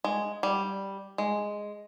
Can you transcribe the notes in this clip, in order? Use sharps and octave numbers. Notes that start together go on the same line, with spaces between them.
G#3
G3
G#3